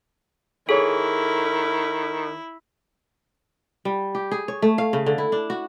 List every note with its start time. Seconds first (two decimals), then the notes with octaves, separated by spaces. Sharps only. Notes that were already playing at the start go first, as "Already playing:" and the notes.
0.69 D#3 E4 G#4 A4 C#5
3.85 G3
4.15 G4
4.31 G#4
4.48 C#5
4.62 A3
4.78 F5
4.93 C#3
5.06 D3
5.18 E4
5.32 D4
5.50 F#4